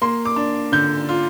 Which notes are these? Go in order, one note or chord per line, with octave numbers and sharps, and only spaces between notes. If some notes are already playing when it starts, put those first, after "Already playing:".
A#3 C6
D6
D4
D3 G6
F4